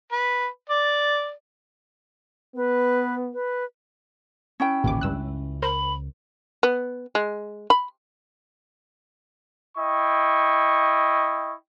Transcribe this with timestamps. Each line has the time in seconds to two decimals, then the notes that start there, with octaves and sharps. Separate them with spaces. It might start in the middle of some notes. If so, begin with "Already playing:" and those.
0.12 B4
0.70 D5
2.56 B3 B4
3.34 B4
4.60 C#4 E4 G5
4.84 A1 D#2 A#2 C#3 E3 D6
5.01 C#2 G2 E6 F#6
5.62 A#4 C5 B5
6.63 B3
7.15 G#3
7.70 B5
9.77 E4 D#5 G5 C#6